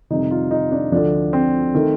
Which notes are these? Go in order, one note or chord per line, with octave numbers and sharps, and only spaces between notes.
F2 C3 D#3 G3 D#4
F4
D#4
D4
D2 D3 F3 D4
C4
D#3 A3